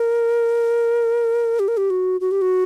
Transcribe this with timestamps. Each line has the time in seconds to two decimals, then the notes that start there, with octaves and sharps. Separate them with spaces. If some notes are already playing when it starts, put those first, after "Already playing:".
Already playing: A#4
1.59 G4
1.68 A#4
1.77 G4
1.90 F#4
2.21 F#4
2.31 G4
2.42 F#4